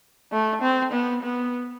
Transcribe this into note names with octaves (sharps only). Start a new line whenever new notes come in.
A3
C4
B3
B3